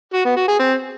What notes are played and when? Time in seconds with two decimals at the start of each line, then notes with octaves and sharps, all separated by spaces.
0.14 F#4
0.25 B3
0.37 F#4
0.48 G#4
0.59 C4